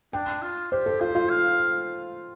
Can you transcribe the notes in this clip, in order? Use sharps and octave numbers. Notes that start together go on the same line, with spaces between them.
D4 G5
F4
G4 C5
A4
F4 C5
F4
F5